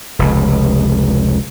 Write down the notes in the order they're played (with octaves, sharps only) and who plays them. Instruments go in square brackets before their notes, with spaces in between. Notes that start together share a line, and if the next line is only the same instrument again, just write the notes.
[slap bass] F1 C#2